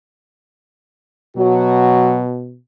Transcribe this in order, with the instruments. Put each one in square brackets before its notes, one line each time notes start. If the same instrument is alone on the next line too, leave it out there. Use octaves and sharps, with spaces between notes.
[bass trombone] B2 [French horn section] F#3 F#4